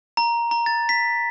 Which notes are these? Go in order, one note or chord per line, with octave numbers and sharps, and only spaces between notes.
A#5
A#5
A6
B6